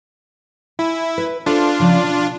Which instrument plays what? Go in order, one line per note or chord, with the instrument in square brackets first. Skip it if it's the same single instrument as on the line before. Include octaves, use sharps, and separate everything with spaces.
[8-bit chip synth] E4 [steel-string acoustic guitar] G#5
[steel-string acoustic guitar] B4
[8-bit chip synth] D4 F4 [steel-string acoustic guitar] A4 C5 E5
[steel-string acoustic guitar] C#3 F3
B2